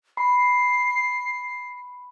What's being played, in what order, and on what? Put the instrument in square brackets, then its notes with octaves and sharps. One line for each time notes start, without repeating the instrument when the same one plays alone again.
[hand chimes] B5 [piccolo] C7